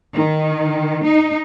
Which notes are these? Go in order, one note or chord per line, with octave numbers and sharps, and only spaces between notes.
D#3
D#4